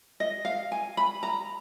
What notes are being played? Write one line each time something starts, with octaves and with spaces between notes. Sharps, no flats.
D#5
F5
G#5
B5
A#5